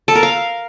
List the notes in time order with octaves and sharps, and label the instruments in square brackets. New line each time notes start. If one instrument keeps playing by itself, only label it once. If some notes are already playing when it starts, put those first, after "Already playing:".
[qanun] A4
A#4
F5